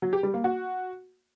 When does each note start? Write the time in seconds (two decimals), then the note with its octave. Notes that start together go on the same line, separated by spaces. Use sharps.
0.02 F#3
0.13 G4
0.23 G3
0.34 A#3
0.44 F#4